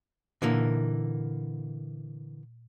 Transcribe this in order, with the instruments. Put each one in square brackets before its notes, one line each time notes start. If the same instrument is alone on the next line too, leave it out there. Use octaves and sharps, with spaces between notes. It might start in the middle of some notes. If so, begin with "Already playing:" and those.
[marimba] A#2 [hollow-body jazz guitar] D3 E3 A#3